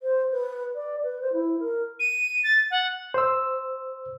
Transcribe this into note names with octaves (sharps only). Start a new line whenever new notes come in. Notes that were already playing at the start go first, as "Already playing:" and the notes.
C5
B4
D5
B4
C5
E4
A#4
D#7
A6
F#5
C5 E6